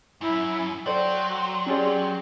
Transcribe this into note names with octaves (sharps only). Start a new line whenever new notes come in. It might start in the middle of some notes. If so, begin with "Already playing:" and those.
F#2 E4
F#3 A4 C5 D5 G5 C6
C#4 G4 G#4 D5